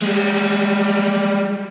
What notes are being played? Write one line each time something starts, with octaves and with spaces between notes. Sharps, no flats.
G3 G#3